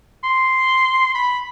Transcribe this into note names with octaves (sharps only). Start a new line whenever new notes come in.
C6
B5